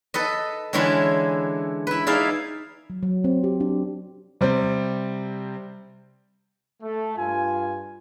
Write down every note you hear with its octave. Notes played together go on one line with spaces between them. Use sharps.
A4 B4 D#5
D3 E3 G#3 C#4 D4 B5
E4 B4
D#4 E4 G#4 D5 E5 F5
F#3
F#3
C4
G4
D4
C3 G3 C4
A3
G2 F4 G#5